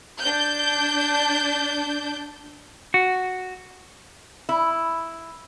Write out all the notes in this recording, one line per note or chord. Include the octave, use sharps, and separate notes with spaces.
D4 G6
F#4
E4